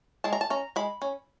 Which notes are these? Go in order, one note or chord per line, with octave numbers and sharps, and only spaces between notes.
G#3 A5
A#5
A5
C#4 A#5
G#3 B5
C#4